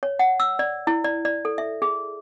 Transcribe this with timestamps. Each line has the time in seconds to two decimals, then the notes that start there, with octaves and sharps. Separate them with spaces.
0.03 C#5
0.19 F#5
0.40 E6
0.59 D5
0.87 E4
1.04 D5
1.25 D5
1.45 A4
1.58 E5
1.82 G#4